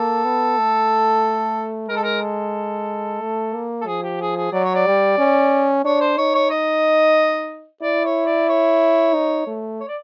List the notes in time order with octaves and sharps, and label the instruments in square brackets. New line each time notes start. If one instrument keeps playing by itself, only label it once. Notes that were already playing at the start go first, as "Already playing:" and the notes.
Already playing: [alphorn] A#3 [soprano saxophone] A4
[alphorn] B3
A3
[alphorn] G#3 [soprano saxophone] A#4
[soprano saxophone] A4
A#4
A4
[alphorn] A3
A#3
[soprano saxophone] A4
[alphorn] F3 [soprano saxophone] G#4
[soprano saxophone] G4
G#4
G#4
[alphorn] F#3 [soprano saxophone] D5
[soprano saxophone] C#5
D5
[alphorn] G3
C#4
[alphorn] D4 [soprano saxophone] C#5
[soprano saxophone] C5
[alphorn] D#4 [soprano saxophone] C#5
[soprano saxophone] C#5
D#5
[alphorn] E4 [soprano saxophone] D5
[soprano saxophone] C#5
D5
C#5
[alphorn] D#4
A3
[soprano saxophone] C#5
D5